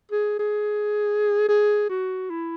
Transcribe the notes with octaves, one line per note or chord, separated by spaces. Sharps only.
G#4
G#4
G#4
F#4
E4